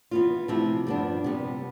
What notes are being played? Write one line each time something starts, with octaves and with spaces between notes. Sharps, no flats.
E3 B3 F4
C3 F3 A3 E4
G2 F3 B3 D4
C3 G3 B3